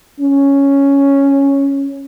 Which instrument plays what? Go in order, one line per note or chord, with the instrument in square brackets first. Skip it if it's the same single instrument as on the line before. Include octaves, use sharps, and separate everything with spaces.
[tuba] C#4